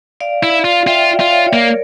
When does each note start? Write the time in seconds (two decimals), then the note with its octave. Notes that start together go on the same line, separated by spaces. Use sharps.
0.20 D5 F5
0.43 E4
0.64 F4
0.86 F4 E5 G5
1.09 D5 F5
1.20 F4
1.31 C#5 E5
1.48 C#5
1.53 A#3 A#4 D5